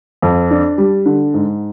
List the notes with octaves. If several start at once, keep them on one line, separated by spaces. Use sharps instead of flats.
F2
D4
G3
D3
G#2